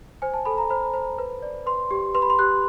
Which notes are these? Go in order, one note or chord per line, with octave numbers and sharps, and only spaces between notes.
C5 G#5
A5
A4 B5
A#5
C5 B5
C5
B4
D5
B4 C6
G4
B4 C6
B5
C6
G4 F#6